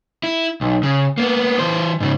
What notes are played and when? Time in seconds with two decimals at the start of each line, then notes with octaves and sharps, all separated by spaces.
0.23 E4
0.61 B1
0.83 C#3
1.18 A#3 B3
1.59 E3 C5
2.00 G#2 C#3